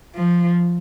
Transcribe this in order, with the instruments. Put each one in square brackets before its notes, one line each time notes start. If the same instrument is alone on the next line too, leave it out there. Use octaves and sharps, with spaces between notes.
[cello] F3